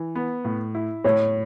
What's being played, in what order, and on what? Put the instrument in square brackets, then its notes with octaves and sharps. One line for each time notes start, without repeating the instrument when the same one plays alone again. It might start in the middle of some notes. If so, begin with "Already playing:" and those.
Already playing: [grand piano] E3
B3
A2
E4
[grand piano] A2 [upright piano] C#5